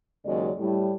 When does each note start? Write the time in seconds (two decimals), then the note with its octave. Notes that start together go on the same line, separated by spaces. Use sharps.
0.25 D#2 C#3 F#3 G#3 D5
0.58 A2 G3